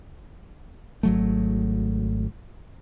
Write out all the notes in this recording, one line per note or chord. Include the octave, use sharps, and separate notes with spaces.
G#1 F#3 A3